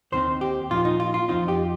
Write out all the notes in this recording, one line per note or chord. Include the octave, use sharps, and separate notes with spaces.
D#2 D#3 C4 D#4 C5
G4
A#2 F3 D#4 F4
D#4
F4
F4
F2 F3 C4 D#4 F4
G4